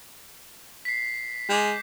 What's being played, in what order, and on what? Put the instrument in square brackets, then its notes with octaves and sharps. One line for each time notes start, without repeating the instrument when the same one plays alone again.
[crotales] B6 C7
[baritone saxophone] G#3 [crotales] D6 G6